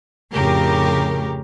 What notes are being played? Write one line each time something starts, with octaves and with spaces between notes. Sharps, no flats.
F2 A2 C#3 G4 A#4